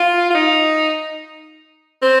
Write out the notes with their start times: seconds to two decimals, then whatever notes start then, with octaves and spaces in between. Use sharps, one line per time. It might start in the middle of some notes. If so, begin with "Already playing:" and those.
Already playing: F4
0.30 F4
0.35 D#4
2.02 C4